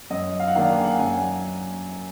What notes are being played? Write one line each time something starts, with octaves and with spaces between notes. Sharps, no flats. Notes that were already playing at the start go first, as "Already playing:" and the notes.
F#2 D#5
F5
F#5
D#3 A#3 D4 F5
F#5
G#5
F#5
F#2 G#5